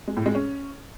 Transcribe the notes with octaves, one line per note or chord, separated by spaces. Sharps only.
G#3
A2
G#3
C#4